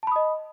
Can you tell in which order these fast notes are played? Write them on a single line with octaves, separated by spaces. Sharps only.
A5 B5 D#6 D#5